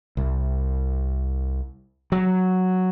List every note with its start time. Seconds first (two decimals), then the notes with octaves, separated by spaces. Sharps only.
0.17 C2
2.12 F#3